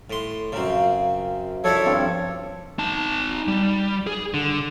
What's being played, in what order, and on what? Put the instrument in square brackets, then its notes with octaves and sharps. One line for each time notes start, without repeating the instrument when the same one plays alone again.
[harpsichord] A2 C6
[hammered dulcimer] F#2 A#4 F5 [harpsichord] C#3 C4
[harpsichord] F3 D4 E4 [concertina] A4 C#5
[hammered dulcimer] G2 C4 C6
[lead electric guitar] D#4 A5
G3
G#4
D3